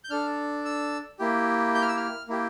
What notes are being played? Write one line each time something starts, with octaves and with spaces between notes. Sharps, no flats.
G6
D4 A4 F6
E6
A#3 E4 G4
G6
F6
E6
F6
A#3 E4 G4